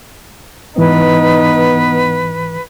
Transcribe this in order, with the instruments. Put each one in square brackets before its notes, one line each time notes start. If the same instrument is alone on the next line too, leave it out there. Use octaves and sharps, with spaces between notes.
[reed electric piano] G#2 E3 [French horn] B3 [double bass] D#4 [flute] B4